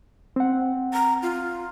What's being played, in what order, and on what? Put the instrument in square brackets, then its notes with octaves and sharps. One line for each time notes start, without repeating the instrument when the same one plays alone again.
[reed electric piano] C4 F#5
[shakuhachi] A#5
F4